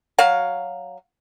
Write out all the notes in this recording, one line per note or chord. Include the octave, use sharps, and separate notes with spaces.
F#3 F#4 F5